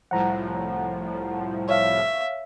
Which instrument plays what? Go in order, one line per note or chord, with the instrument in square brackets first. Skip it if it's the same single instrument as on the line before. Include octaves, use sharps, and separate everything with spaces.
[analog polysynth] C2 A2 F3 [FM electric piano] F#5 A#5
[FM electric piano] C#5 F5 [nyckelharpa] E5